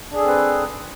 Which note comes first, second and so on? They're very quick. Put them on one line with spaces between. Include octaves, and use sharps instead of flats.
D4 G#4 A4 C4 B4